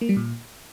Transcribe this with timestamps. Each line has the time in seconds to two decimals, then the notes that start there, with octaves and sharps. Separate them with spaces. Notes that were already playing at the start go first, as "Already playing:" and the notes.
0.01 A#3
0.09 G3
0.17 A#2